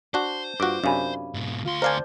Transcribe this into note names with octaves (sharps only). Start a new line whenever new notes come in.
D4 F#4 C5 A5
G2 F4 F#4 D6
F#2 C3 D4 F5 G#5 B5
G#2 B2
D2 F4 C6
A#4 C5 D5 F5 G#5 A5